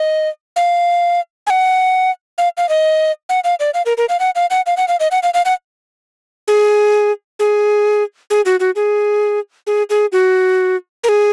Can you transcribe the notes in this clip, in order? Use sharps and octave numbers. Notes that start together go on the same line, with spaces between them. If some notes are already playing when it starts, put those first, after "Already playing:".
Already playing: D#5
F5
G#5
F#5
F5
F5
D#5
F#5
F5
D5
F5
A#4
A#4
F5
F#5
F5
F#5
F5
F#5
F5
D#5
F#5
F5
F5
F#5
G#4
G#4
G#4
F#4
F#4
G#4
G#4
G#4
F#4
A#4
G#4